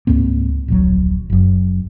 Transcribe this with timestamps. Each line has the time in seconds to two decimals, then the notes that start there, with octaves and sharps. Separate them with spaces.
0.07 C#2 G#2 A#3 C4
0.68 D1 A#1 F#3
1.30 F#1 F#2